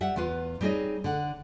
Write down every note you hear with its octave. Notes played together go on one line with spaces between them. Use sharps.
G3 E5 F#5
E2 B3 F4 B4
G3 C4 D#4 G#4 C#5 D#5
D3 F#5